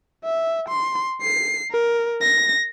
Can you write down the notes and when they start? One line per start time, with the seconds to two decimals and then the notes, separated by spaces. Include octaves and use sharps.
0.25 E5
0.69 C6
1.21 C7
1.72 A#4
2.21 A#6